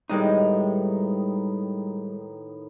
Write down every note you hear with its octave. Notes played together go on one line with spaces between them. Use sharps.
A2 D#3 G3 G#3 B3 D#4